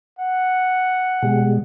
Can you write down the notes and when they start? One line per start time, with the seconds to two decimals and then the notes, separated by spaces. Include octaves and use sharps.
0.19 F#5
1.22 B2 G3 G#3